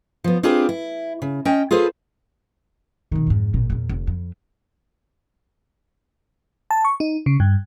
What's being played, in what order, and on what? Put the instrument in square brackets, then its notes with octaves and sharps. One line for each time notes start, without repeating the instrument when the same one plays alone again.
[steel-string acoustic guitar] F3 B3
C4 D4 F4 G4 G#4 B4
E4
C#3
C#4 D#5 G5
F4 G#4 A4 B4 C5
[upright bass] B2 D#3
F2 G#2
G#1 A#2
E2 A#2
F1
F2
[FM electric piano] A5
C#6
D#4
C#3
G2